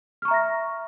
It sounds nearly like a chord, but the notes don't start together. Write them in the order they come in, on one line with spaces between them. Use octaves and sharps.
F6 C#6 A#5 E5 A#6